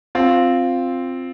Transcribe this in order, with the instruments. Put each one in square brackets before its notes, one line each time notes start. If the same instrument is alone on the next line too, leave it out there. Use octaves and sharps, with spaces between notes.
[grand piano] C4 F4